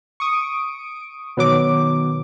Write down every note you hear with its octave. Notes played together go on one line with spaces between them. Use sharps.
C#6 D#6 D7
B2 D#3 F#3 D6